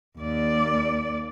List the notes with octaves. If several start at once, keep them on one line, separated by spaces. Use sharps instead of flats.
D#2 D5